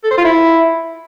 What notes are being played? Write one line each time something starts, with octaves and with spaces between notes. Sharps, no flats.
A4
C5
F4
E4